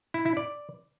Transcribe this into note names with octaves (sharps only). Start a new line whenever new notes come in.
E4
E4
D5